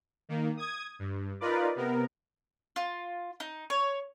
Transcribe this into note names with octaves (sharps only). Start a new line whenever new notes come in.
D#3 A#3
D#6 G#6
G2
D#4 F4 A#4 B4 D5
C3 B3 A#4
F4
D#4
C#5